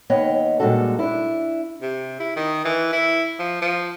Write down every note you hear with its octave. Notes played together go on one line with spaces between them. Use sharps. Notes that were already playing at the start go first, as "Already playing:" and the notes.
D#2 B3 C#5 D#5 G5
A#2 G3 G#3 D4 F#4 A4
D4 E4
C3
E4
D#3
E3
E4
F3
F3